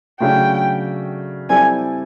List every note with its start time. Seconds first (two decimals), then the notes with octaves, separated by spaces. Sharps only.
0.20 C#3 F#3 A3 D4 G5
1.49 G3 C4 E4 A4 D5 G#5